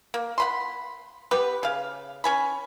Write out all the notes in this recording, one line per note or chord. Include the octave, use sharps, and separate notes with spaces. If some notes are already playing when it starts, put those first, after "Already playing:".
A#3
F#5 B5 C6
B3 G4 B4
C#3 F5
C#4 G#5 B5